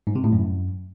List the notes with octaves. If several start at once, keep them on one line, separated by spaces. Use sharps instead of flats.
G#2
C3
A2
F#2